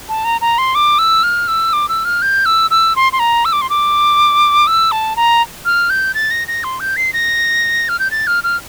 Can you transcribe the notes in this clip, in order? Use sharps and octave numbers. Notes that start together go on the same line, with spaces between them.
A5
A#5
A#5
C6
D6
E6
F6
E6
D6
E6
F6
G6
E6
E6
C6
C6
A#5
E6
D6
C6
D6
E6
A5
A#5
F6
G6
A6
A#6
A#6
C6
G6
C7
A#6
F6
G6
A6
F6
F6